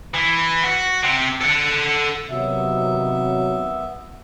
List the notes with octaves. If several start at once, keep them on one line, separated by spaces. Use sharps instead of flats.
E3
F#4
C3
A4 F#5
C3 D#3 F#3 B3 E5